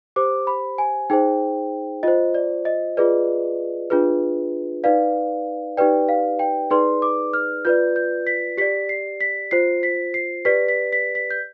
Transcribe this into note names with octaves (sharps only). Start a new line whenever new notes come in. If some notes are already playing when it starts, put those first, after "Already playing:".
G4 C5 D6
B5
G#5
D#4 G#4 C5 G5
F4 C5 D#5
D5
D#5
F4 G#4 B4 D5
D4 F4 G#4 B4
D#4 B4 D5 F5
D#4 G4 B4 D5 G5
F5
G5
D#4 G#4 B4 D5 C6
D6
F6
F4 B4 D5 G6
G6
B6
G4 D5 B6
C7
B6
F4 C5 C7
B6
C7
G4 B4 D5 B6
B6
B6
B6
G6